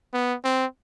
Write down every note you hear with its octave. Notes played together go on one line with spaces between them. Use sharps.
B3
C4